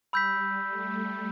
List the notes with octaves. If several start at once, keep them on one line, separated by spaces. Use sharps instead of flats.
G3 B5 E6 G6 B6
A3